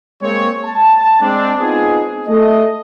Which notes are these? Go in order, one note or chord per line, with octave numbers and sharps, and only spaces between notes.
G#3 A#3 C4 C#5
A5
G#3 C4 D4
B3 C4 D#4 F4 G#4
A3 D#5